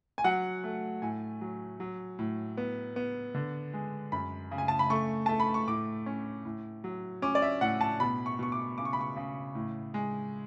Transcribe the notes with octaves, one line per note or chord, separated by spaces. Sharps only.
G#5
F#3 F#5
A3
A2 G#5
F#3
F#3
A2
B3
B3
D3
G#3
F#2 B5
C#3
G#5
A5
B5
A3 C#6
A3 A5
B5
C#6
A2 D6
C#4
A2
F#3
C#4 D6
D5
E5
A2 F#5
A5
B2 B5
C#6
B2 C#6
D6
C#3 D6
C#6
B5
C#6
C#3
A2
G#3